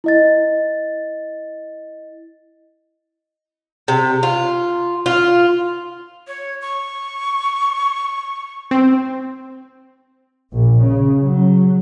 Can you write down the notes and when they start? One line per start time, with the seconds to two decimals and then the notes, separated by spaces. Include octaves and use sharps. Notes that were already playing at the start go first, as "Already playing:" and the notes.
0.04 E4 D#5 A6
3.88 C3
4.23 F4
5.06 F4
6.27 C#5
6.61 C#6
8.71 C4
10.52 A#1
10.82 C#3
11.21 F#3